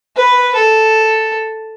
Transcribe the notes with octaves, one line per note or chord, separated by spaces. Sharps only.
B4
A4